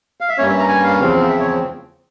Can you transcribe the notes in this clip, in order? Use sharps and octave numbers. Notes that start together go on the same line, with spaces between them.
F5
E5
G2 G3 A#3 C#4 C#5
E5
A#5
G#5
F5
E2 C#3 F3 C4
E5
C#5